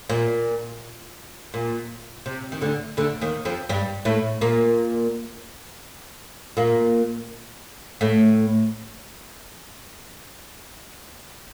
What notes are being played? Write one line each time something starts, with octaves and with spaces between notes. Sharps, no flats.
A#2
A#2
C3
D#3
D2 D3
D2 D3
D#2 D#3
F2 F3
G2 G3
A2 A3
A#2 A#3
A#2 A#3
A2 A3